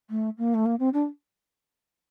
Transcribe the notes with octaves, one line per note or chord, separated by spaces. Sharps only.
A3
A#3
A3
A#3
C4
D4